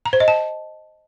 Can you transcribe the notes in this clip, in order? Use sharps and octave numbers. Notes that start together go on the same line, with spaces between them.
A#5
C5
D#5
A5